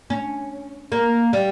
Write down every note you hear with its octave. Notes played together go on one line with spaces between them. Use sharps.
C#4
A#3
G3